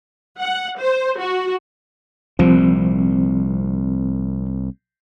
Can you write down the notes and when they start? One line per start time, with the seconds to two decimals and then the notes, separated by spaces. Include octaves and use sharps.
0.40 F#5
0.80 C5
1.18 F#4
2.39 C2 A#2 F3 C4